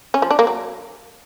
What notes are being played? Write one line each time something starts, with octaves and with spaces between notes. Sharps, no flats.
C#4
F3
D4
A#3
F#3